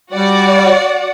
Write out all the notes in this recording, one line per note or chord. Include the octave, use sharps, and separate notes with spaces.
G3 F#4 D5 F#5